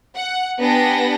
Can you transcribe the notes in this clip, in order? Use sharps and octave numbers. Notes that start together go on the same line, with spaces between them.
F#5
B3 D4 G4 G5 G#5 A#6